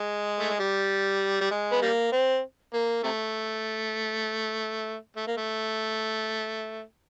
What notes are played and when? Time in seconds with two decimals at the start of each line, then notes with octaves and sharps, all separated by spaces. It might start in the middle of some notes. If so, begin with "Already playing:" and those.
Already playing: G#3
0.39 A3
0.50 G#3
0.60 G3
1.41 G3
1.51 G#3
1.72 B3
1.82 G3 A#3
2.12 C4
2.73 A#3
3.04 C3 A3
5.16 A3
5.27 A#3
5.37 A3